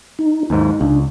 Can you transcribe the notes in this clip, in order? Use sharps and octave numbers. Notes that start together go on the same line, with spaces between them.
D#4
D#2 G#2 D#4
C#2 D4